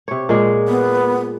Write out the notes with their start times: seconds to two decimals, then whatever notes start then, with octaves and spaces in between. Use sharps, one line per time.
0.08 C3 C#5
0.29 A#2 G#3
0.68 B3